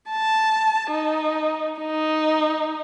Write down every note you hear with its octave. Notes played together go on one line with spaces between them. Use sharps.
A5
D#4
D#4